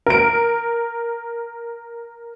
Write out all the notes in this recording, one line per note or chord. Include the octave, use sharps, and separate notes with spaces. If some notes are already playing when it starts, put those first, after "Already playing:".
A#4 D7